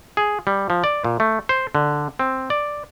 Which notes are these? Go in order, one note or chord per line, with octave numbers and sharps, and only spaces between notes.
G#4
G3
F3
D5
A#2
A3
C5
D3
C4
D5